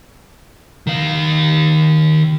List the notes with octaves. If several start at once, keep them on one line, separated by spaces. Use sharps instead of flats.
D#3 F5